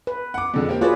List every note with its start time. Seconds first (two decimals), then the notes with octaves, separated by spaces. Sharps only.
0.07 B4
0.34 F#5 D6
0.54 F2 D3 G#3
0.69 A#3 C4 G4
0.81 F4 F#4 G#4 B4 C#5 D5